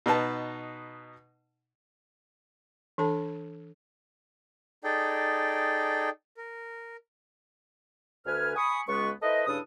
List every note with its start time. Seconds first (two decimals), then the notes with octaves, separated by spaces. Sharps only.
0.06 B2 D#4 B4 A5
2.98 E3 D4 A4 A5
4.84 D#4 G#4 A4 D5 G5
6.37 A#4
8.26 D2 B4 G#5 F6
8.56 G#5 B5 C#6 D#6
8.88 C#2 G#3 B3 C#6
9.22 E4 A4 B4 C5 D#5
9.46 G2 C#3 D4 E4 A4 D#6